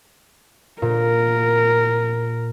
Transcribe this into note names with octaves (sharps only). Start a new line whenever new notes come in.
A#2 A#4